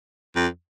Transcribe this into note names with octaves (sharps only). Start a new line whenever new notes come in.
F2